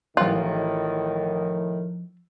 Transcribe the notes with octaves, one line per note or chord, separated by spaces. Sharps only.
A1 A2 D#3 F3 F4 F#6